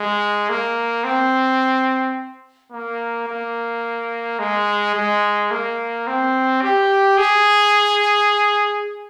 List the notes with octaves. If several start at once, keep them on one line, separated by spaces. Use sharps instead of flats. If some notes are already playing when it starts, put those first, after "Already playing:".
Already playing: G#3
A#3
C4
A#3
A#3
G#3
G#3
A#3
C4
G4
G#4